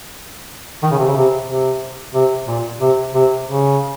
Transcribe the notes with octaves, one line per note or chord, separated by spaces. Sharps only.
D#3
C#3
C3
C#3
C3
C3
C3
A#2
C3
C3
C#3